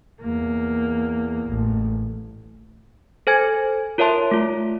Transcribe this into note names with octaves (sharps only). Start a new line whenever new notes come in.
E2 A#3
A1
A4 C5 G#5 G#6
F4 A#4 C#5 E5 A5 C6
A3 F4